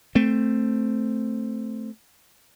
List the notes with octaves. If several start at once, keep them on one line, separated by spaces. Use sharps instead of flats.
A3 C4